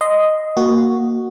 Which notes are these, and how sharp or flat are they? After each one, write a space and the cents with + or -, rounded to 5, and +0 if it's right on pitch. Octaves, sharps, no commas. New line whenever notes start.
D#5 +0 C6 -15
A#3 +0 F#4 +0